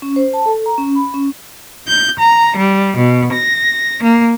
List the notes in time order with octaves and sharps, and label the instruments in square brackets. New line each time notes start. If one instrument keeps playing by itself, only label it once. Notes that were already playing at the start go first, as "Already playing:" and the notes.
[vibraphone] C#4
C5
A5
A4
A#5
C#4
B5
C#4
[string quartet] G6
A#5
G3
B2
A#6
A#3